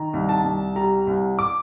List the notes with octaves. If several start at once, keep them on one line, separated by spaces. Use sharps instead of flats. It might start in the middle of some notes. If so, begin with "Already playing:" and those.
Already playing: D#3 A#5
C2
A5
C2
G3 A#5
C2
D6